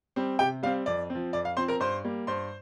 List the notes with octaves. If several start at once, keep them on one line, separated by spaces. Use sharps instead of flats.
G3 C4
C3 G4 G5
G3 C4 F5
F2 D5
C4
F3
F2 D5
F5
F3 C4 C5 C6
A#4 A#5
G2 C5 C6
G3 A#3
G2 C5 C6